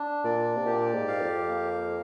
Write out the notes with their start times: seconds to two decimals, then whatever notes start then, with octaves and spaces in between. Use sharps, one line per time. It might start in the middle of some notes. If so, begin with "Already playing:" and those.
Already playing: D4
0.24 A#2 D5
0.56 C3
0.65 A#2 G4
0.94 G#2
1.08 F5
1.21 F2
1.49 A#3